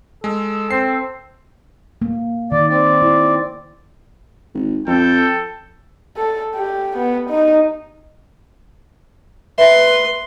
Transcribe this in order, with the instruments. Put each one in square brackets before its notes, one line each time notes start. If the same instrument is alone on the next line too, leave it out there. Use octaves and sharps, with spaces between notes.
[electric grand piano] G#3 [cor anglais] A4
[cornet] C4 [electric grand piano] C7
[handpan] A#3
[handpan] D#3 [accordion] D5
[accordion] C4 D5
[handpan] E4
[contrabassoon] G#1
[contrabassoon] F2 [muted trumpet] A4 [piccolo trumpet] G5
[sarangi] A4
G4
B3
D#4
[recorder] B4 [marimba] E5 [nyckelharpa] C6